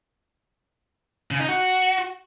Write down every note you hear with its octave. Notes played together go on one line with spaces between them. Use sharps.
C#3
D#4
F#4